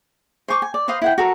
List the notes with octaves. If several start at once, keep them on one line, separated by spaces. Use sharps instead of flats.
C5 G#5 C#6 D6
G#5
D5
B4 C5 D#5 F5
E4 F#5 G5
F#4 A4 A#4